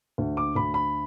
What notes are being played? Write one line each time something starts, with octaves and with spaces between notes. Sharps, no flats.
D2
D6
D2 B5
B5